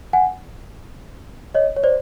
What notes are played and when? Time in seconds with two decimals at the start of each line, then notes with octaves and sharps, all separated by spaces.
0.13 F#5 G#5
1.55 C#5 D#5
1.77 C#5
1.83 C5 D5